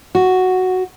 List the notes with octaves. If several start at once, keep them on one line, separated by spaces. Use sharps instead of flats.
F#4